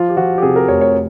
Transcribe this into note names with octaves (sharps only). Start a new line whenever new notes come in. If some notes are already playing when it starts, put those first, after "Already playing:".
Already playing: F3 F4
G4
F3 F#4
G4
C3 G#4
A#4
F1 C#5
C#5